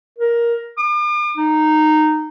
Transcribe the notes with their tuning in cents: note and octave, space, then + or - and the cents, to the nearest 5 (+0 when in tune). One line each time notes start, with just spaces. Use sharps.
A#4 +10
D6 +45
D#4 -10